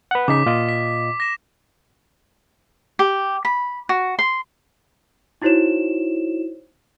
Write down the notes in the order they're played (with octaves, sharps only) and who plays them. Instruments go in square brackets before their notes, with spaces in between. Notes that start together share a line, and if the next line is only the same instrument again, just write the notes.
[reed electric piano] B4 F#5
[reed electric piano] C#3 D#4 [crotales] D6 B6
[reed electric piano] A#2 F4 D#5
[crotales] B6
A#6 E7
[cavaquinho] G4
B5
F#4
C6
[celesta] D#4 E4 F#4 C5 C#5 E7